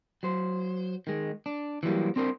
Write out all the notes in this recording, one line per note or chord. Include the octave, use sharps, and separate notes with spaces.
F#3 C5
D#3 G#3
D4
E3 F#3 G3 A#3
C4 D4 A#4 C5